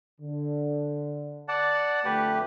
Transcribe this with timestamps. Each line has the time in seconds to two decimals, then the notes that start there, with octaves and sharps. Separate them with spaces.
0.21 D3
1.48 D5 F#5 A5
2.05 F2 D3 A3 G4 B4